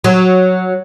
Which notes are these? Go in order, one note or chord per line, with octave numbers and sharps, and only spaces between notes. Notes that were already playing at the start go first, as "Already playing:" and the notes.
F#3